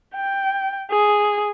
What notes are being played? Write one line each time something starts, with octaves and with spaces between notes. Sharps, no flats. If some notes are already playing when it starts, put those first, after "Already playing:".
G5
G#4